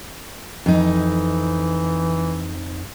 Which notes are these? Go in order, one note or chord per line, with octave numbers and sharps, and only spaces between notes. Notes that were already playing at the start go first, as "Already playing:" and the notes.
F2 E3 D#4